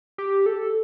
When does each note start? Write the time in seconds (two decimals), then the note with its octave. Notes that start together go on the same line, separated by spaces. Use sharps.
0.18 G4
0.46 A4